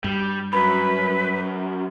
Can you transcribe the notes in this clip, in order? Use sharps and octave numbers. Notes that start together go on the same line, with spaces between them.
G2 G3
F#2 B4 B5